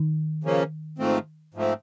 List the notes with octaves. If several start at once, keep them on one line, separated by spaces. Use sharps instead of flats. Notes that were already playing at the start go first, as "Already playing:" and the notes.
Already playing: D#3
C#3 F3 A#3 C#4
G#2 F3 A3 C4
G#2 F3 A3 C4